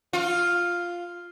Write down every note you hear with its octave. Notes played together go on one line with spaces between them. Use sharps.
F4